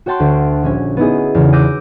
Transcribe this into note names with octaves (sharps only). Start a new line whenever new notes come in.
F#4 C#5 G5 A5 C6 F#6
D2
A#1 C#4 G#6
B3 D#4 E4 G#4
E2 C#3
D6 E6 F#6 G6 A#6 D#7